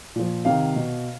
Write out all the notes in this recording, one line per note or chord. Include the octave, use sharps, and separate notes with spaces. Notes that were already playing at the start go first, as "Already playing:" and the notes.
A#2 F3
C3 D#3 F5
B2